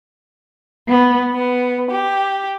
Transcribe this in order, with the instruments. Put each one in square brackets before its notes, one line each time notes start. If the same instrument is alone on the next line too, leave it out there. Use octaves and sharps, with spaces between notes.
[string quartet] B3
B3
G4